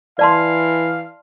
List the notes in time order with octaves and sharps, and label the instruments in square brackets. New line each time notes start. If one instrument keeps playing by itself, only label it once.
[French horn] E3 [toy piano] D5 A5 C6 [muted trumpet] F5